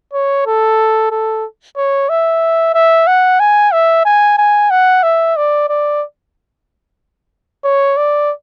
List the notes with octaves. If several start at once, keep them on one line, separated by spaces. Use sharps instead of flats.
C#5
A4
A4
C#5
E5
E5
F#5
G#5
E5
G#5
G#5
F#5
E5
D5
D5
C#5
D5